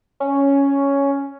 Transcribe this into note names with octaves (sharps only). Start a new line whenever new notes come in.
C#4